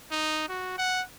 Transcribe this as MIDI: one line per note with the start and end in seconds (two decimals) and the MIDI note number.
0.11 0.47 63
0.49 0.74 66
0.78 1.02 78